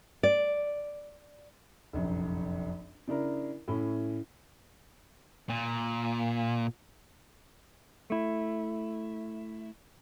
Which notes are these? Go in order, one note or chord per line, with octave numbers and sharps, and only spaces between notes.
D5
F1 A#1 F#2
C#3 D4 E4 A#4
A2 C#4 E4
A#2
A3 E4